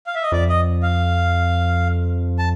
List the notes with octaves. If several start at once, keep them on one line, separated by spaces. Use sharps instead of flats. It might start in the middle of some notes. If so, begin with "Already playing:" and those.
F5
E5
D#5
F2 D5
D#5
F5
A5